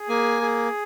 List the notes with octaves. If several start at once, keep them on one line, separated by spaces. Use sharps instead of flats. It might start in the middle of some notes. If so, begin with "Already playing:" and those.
Already playing: G#4
A#3 G#5
G#4